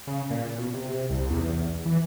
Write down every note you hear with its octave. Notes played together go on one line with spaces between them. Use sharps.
C#3
A#2
B2
C3
C2
E2
E3